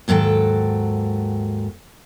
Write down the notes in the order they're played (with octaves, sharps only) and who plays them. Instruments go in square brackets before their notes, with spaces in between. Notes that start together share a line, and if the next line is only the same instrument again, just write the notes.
[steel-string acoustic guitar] D#2 G#2 F#3 A4 G5